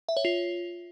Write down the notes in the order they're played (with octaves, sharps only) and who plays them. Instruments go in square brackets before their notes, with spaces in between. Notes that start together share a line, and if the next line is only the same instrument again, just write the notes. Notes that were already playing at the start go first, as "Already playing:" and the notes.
[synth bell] E5
C#5
F4